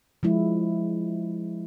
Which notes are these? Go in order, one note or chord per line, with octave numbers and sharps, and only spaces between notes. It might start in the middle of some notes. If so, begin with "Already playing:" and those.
F3 G#3 E4